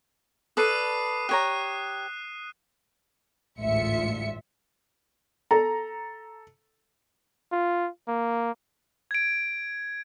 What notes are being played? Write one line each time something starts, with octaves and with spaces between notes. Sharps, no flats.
A4 B4 D5 D#6 C7 D#7
G4 C#5 A#5 F#6
A1 D2 G#2 F4 E5 C#7
A4 A#5
F4
A#3
G#6 D7